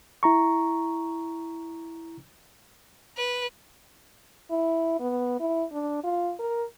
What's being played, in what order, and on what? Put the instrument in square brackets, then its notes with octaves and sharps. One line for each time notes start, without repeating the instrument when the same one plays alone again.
[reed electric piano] E4 A#5 C#6
[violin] B4
[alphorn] E4
B3
E4
D4
F4
A#4